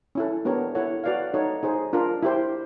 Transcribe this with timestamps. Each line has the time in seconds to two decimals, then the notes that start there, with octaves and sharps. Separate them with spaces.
0.15 C#4 E4 A4
0.45 B3 D4 G4 A#4 C#5
0.75 E4 A4 C#5 F#5
1.04 F#4 B4 D5 F5
1.33 D#4 F#4 A4 C#5
1.63 D#4 G#4 C5
1.93 D4 F4 A#4
2.23 E4 G4 C5